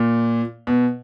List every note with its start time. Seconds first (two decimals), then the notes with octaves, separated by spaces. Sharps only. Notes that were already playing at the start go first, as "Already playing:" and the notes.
Already playing: A#2
0.67 B2